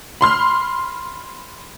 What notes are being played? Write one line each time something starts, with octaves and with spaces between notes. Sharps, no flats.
B5 C6 F6